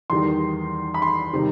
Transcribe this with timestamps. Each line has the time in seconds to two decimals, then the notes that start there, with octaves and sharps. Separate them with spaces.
0.10 E2 D#3 G3 D#4 C6
0.94 B5
1.02 C6
1.33 C3 D#3 G3 D#4